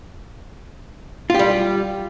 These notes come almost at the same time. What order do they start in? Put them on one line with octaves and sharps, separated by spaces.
F4 G4 G3